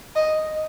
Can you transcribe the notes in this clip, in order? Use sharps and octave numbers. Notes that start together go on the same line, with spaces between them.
D#5